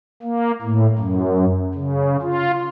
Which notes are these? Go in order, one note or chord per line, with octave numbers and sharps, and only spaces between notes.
A#3
A2
F#2
C#3
F4